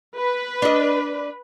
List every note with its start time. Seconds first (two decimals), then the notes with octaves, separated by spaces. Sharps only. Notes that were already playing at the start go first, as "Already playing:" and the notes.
0.16 B4
0.62 D4 D#5